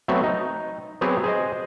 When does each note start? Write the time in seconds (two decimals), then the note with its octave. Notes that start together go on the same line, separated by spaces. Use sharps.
0.08 F#3 A3 B3 C4
0.23 D#4
1.01 F#3 B3 C4 G4 G#4
1.24 G#4 C5 D#5